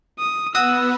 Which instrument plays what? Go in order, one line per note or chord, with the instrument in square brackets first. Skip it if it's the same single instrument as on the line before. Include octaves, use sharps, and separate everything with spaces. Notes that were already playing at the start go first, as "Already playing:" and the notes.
[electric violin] D#6
[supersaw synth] B3 [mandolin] F#4 [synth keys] D#6 [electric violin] E6